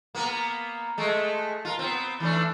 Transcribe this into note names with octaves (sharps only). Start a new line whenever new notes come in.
A#3 B3 A#4
G#3 A3
F4 A#4
B3 C4
E3 A3 D4